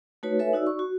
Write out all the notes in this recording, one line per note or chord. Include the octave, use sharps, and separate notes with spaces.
A3 D#4 F#4 B4 C#5
A4 B4 C#5 E5 G#5
D#4 F#4 D5 E6
C#6
F#4